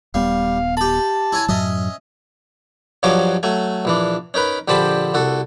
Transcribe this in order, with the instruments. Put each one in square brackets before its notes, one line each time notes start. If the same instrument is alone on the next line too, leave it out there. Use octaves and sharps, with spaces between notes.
[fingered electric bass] D#1 B3 [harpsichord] G3 [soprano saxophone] F5
[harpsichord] G4 B5 [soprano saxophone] A5
[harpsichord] E4 C#5 G#5
[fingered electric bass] F#2 A2 F#3 [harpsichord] C#4 D#5 E5
[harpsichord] G2 F3 F#3 C#5 D#5 D6
F#3 A3 G#5
A#1 E3 D4
C#4 D#4 A#4 B4
A#1 D3 G4 C5 A5 B5
C2 F#4 A4